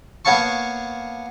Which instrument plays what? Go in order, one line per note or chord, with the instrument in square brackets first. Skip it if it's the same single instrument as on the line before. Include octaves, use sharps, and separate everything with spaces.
[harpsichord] A#3 B3 C#5 F5 A5 C#6